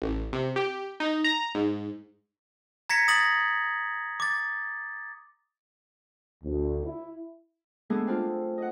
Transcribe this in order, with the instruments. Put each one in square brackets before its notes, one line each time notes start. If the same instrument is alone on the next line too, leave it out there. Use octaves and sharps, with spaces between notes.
[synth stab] A1
C3
G4
D#4
A#5
G#2
[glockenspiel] A#5 G#6 A#6 B6 C#7
D#6 A6 A#6 F#7
D6 A6
[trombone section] D2
E4
[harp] G#3 A3 B3 D4 G#4 A4
C4 D4 F4
D#5 F#5